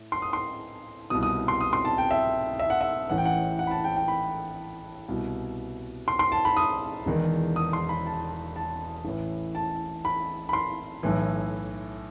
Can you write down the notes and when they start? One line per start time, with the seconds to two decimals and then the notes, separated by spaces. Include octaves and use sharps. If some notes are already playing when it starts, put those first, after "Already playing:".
Already playing: A2
0.12 C6
0.22 D#6
0.33 C6
1.10 C2 B2 D#6
1.23 D#6
1.48 C6
1.61 D#6
1.73 C6
1.85 A5
1.98 G5
2.11 E5
2.60 E5
2.70 F#5
2.81 E5
3.10 A1 A2 E3 F#5
3.18 G5
3.25 F#5
3.59 F#5
3.67 B5
3.71 A5
3.84 G5
3.96 G5
4.08 B5
5.08 C2 B2
6.08 C6
6.19 C6
6.32 A5
6.45 B5
6.57 D#6
7.06 E1 E2 D#3
7.56 D#6
7.73 C6
7.89 B5
8.06 A5
8.56 A5
9.05 A1 A2 E3
9.55 A5
10.05 B5
10.49 B5
10.53 C6
11.03 B1 A2 E3